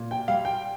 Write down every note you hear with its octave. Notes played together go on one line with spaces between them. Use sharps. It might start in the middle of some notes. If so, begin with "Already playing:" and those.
Already playing: A#2
G5
G3 F5
G5